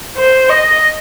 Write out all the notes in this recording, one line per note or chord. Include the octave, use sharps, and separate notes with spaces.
C5
D#5